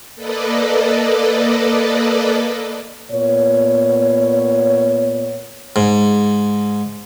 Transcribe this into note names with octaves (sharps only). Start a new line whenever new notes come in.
A#3 A4 B4 D5 D#5
A#2 B3 C#5
G#2